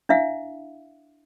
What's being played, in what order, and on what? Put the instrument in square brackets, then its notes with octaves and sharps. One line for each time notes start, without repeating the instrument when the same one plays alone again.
[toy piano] D4 E4 E5 F5